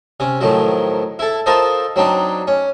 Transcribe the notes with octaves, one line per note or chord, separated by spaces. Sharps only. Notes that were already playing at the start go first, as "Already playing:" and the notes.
C3 C#4
A2 D#3 F3 F#3
E4 A4
F4 A4 A#4 C5 D#5
F#3 C4 D4 D#4
C#4